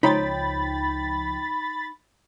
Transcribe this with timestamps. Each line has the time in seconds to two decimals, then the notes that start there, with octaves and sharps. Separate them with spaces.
0.03 C#2 F3 D#4 C#5 G5 B5 C6 A6